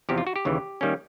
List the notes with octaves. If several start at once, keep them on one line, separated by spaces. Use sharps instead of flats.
E2 C3 F3 G4
F4
F#4
G4
D#2 C#3 E3
D#3 G3 A#3 C#4